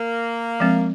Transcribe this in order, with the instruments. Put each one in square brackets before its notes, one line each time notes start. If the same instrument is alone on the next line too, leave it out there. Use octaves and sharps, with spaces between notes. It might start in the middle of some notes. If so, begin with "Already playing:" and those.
Already playing: [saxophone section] A#3
[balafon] F3 G#3 C4